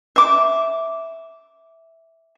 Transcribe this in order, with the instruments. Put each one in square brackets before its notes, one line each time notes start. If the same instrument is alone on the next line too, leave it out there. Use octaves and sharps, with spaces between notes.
[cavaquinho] E5 D6